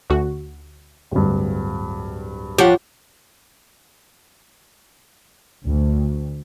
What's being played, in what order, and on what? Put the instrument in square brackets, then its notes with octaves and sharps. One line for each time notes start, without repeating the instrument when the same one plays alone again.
[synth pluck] D2 F#4
[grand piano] D1 G2
[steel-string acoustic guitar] F3 C#5 [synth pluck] G4 F#5
[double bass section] D2